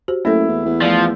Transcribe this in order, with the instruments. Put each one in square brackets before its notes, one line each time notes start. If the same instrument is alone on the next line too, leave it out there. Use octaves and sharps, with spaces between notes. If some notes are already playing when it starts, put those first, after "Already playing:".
[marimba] F#4 G4 C5
[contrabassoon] F#2 [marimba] A3 A#3 A4 [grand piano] E4
[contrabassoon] E2
E2
[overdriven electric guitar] F3 [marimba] A3 D5